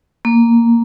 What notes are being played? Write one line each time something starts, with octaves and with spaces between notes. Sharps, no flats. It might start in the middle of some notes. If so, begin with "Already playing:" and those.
A#3